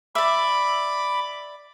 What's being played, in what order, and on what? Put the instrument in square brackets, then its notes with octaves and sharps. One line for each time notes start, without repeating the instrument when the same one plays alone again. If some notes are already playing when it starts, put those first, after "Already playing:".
[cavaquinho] D5 E5 [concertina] B5 D6